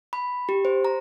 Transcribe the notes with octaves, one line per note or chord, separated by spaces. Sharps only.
B5
G4
C5
A#5